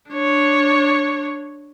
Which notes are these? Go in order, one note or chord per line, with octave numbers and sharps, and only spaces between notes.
D4 C#5